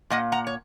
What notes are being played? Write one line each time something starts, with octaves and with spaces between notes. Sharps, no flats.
A#2 A#3 D#5 F#5
F#5 A#5
C#5